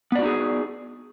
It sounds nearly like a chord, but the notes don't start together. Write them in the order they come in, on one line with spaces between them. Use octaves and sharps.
B3 D5 F#4 D#4 G#4